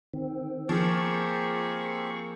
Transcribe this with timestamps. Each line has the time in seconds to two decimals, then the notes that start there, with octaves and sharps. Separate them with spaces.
0.13 D#3 C4
0.69 F3 A#3 C4 G4 G#4 C#6